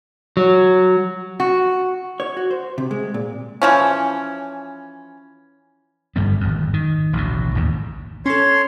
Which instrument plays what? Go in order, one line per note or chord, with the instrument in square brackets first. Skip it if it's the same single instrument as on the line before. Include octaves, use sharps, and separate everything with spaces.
[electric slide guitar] F#3
[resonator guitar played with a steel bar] F#4
[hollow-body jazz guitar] C#5
F#4
C5
C3
G#3
A#2
[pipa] E3 F3 C#4
[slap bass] G1 G2 G3 B3
G#1 F2
D#3
A1 D2 B2
A1 D#2 G#2
[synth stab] C#4 A4 [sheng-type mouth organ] C#5 C6